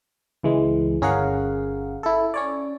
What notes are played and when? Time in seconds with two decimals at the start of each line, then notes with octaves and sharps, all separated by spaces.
0.43 C#2 E3 G#3
1.01 G1 C#4 G#4 A#4 F5 F#5
2.03 E4 A4
2.34 C#4 C#5 D5